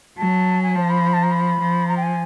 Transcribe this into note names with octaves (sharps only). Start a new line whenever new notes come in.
F#3 A5
G#5
F3 A5
B5
A5
A#5
B5
F3
A#5
G5
G#5